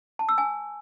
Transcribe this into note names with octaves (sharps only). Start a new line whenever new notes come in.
A5
E6
G#5